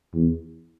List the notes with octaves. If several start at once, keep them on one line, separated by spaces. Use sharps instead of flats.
E2